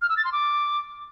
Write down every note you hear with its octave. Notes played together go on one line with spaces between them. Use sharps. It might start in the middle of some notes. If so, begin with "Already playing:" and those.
F6
E6
A6
C6
D6